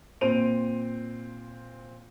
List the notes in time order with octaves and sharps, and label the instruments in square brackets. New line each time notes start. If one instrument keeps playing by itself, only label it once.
[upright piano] A#2 C4 C5 D7 D#7 F7